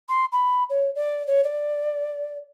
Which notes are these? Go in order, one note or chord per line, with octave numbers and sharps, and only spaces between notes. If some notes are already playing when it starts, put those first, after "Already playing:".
C6
B5
C#5
D5
C#5
D5